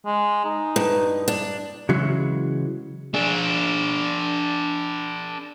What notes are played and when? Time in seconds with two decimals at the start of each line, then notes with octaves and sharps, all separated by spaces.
0.06 G#3
0.45 D#4
0.76 G2
1.28 D4
1.89 C#3 E3 F#3 G#3
3.14 D4 G#4